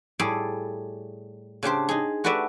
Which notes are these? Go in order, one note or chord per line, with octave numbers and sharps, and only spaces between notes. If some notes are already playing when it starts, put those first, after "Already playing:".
A2 G3 G#4 A4 D5
C#3 D4 G4 C5
D#4 G#4
A3 F#4 G4 B4 D5 E5